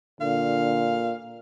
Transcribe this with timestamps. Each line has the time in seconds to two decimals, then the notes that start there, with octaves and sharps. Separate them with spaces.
0.21 A#2 D3 F5